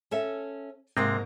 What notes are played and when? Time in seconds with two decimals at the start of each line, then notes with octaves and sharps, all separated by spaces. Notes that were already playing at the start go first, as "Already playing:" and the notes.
0.11 C#4 A4 E5
0.97 G#2 C3 G#3 A#3 C4 D#4